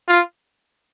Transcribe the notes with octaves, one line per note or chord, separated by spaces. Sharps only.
F4